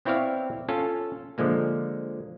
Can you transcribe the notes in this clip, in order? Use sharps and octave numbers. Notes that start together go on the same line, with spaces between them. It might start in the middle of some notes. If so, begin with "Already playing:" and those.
B3 C4 E4 C#5 D5 F5
C#4 F4 A4
D3 F3 G#3 A#3